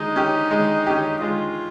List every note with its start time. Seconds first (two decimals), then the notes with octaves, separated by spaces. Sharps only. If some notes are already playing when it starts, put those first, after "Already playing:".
Already playing: G#3 D#4
0.16 C#4 G4
0.51 G#3
0.87 C#4 G4
1.22 G#3 F4